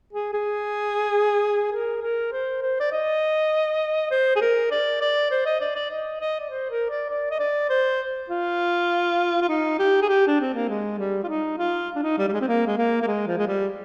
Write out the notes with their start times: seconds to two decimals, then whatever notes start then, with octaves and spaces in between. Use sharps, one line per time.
0.13 G#4
0.33 G#4
1.72 A#4
2.01 A#4
2.32 C5
2.62 C5
2.80 D5
2.92 D#5
4.11 C5
4.36 G#4
4.41 A#4
4.71 D5
5.01 D5
5.31 C5
5.46 D#5
5.60 D5
5.75 D5
5.90 D#5
6.20 D#5
6.40 D5
6.50 C5
6.70 A#4
6.90 D5
7.10 D5
7.31 D#5
7.39 D5
7.70 C5
8.30 F4
9.41 F4
9.49 D#4
9.79 G4
10.02 G#4
10.09 G4
10.27 D4
10.41 C4
10.54 A#3
10.69 G#3
10.99 G3
11.24 F4
11.28 D#4
11.58 F4
11.95 D4
12.02 D#4
12.18 G3
12.28 G3
12.32 G#3
12.41 C4
12.48 A#3
12.66 G#3
12.78 A#3
13.02 A#3
13.07 G#3
13.27 F3
13.38 G#3
13.47 G3